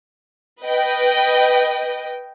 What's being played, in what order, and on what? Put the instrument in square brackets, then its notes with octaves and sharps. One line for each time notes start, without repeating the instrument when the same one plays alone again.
[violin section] B4 D#5 G5